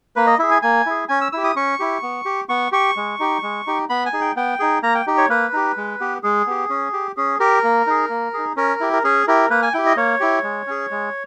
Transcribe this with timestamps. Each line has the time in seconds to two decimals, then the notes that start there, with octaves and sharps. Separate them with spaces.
0.16 A#3 B4
0.27 D#5
0.39 E4 G#4 E5
0.51 G#5
0.62 A#3 G#5
0.86 E4 G#4
1.09 C#4 G#5
1.21 E6
1.32 E4 G4 E6
1.44 D#6
1.56 C#4 C#6
1.79 E4 G4
2.02 B3
2.25 G4
2.49 B3 C#6
2.72 G4 C#6
2.97 G#3
3.20 D#4 G4
3.43 G#3
3.67 D#4 G4
3.90 B3 B5
4.06 G#5
4.13 D#4 G#4
4.21 G5
4.36 B3 G5
4.60 D#4 G#4
4.83 A#3 A#5
4.95 G5
5.07 D#4 G4
5.18 C#5
5.29 A#3 B4
5.53 D#4 G4
5.77 G#3
6.00 B3 G4
6.23 G#3 G#4
6.47 B3 G4
6.70 C#4
6.93 G4
7.17 C#4 G#4
7.40 G4 A#4
7.64 A#3
7.87 D#4 G#4
8.10 A#3
8.34 D#4 G#4
8.56 C#4 A#4
8.80 E4 G4
8.93 A#4
9.04 C#4 G#4
9.27 E4 G4 A#4
9.50 A#3 B4
9.62 G#5
9.73 E4 G4 G5
9.86 D#5
9.97 A#3 C#5
10.20 E4 G4
10.43 G#3
10.67 C#4 G#4
10.91 G#3